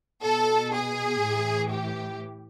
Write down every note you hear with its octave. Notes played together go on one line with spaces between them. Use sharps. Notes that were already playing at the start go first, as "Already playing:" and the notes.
B2 A4
G#4
A2 E3
G4